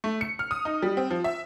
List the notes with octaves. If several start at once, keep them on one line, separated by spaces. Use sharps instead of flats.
A3
C#7
F6
D#6
D#4
G3
C4
F3
E5